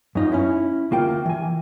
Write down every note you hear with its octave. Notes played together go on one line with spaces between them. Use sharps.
F#2 D#4 F4
C#4 E4
D2 A#3 F4 G5
E3 G#5